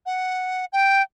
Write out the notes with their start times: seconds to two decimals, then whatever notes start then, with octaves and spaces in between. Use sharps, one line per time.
0.06 F#5
0.73 G5